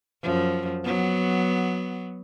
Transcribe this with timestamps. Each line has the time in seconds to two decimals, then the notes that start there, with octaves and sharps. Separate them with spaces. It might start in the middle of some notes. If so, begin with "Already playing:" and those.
0.22 F#2 F3
0.83 F#3 B3